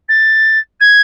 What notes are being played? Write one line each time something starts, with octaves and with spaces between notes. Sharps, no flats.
A6
G#6